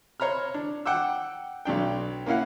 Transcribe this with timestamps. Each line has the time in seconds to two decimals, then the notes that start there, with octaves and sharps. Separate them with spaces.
0.20 C5 C#5 A#5 B5 F6
0.54 D4
0.86 F#5 G5 D6 E6
1.65 B1 F#3 D4 G5
2.26 A#3 C#4 E4 F5 F#5